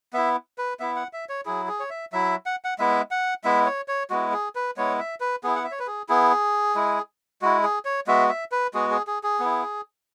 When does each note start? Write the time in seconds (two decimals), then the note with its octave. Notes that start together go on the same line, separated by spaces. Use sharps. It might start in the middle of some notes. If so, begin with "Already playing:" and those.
0.13 B3 E4 E5
0.58 B4
0.80 B3 E4 E5
0.96 F#5
1.13 E5
1.29 C#5
1.46 F#3 E4 G#4
1.68 G#4
1.80 C#5
1.90 E5
2.12 F#3 E4 E5
2.46 F#5
2.65 F#5
2.79 G#3 B3 E4 E5
3.11 F#5
3.44 G#3 B3 E4 E5
3.66 C#5
3.88 C#5
4.10 G#3 B3 E4 F#4
4.33 G#4
4.55 B4
4.77 G#3 B3 E4 C#5
4.99 E5
5.20 B4
5.44 B3 E4 G#4
5.56 F#5
5.64 E5
5.71 C#5
5.79 B4
5.87 G#4
6.09 B3 E4 G#4
6.75 G#3 E4
7.42 G#3 E4 F#4
7.63 G#4
7.85 C#5
8.07 G#3 B3 F#4 E5
8.29 E5
8.52 B4
8.74 G#3 B3 F#4 G#4
8.91 G#4
9.07 G#4
9.23 G#4
9.40 B3 E4